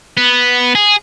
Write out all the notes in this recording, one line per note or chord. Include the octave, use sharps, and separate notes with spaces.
B3
G#4